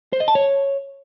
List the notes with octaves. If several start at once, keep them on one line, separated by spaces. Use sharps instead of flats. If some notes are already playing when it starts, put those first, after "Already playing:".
C5
D#5
A5
C#5